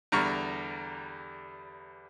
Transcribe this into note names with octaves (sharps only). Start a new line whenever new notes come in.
E2 D3 G3 A#5 C#6 F6